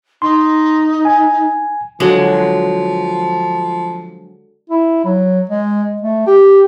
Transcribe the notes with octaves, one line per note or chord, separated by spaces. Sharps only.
D#4 C6
G#5
D3 F3 F#3 G#3
E4
F#3
G#3
A3
G4